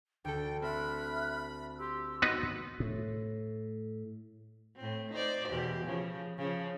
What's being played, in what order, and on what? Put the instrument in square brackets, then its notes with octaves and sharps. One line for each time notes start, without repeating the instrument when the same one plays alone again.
[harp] D2 A4 [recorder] G5
[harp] C4 [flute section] E5 F6 F#6 [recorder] B5
[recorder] G4 [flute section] C6 E6
[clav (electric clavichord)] B3 D#4 B4 [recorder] F#4
[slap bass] A2
[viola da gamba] A2 C4
D#4 C5 D5
E2 B2 G4
C#3 F3
C#3 F3